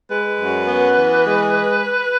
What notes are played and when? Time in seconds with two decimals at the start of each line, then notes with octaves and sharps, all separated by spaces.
0.09 G#3 B4
0.39 F#2
0.68 B3
0.97 E3
1.26 G#3